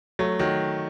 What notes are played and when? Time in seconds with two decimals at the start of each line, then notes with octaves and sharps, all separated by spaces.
0.19 F#3 A3
0.39 D#3 F#3